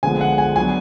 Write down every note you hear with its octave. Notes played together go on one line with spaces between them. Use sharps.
D3 F3 G#3 B3 G#5
F#5
G#5
F#3 B3 D4 G#5